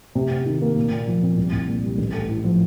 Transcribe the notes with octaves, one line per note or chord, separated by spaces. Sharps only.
C3
C3
D#3
A#3
A#2
A#2
F3
C4
C2
C2
A#2
G3
A1
A3
A2
F3